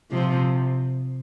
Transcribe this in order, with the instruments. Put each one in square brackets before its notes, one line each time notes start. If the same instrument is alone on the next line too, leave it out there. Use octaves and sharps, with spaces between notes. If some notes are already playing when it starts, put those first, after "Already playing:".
[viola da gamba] C3 F3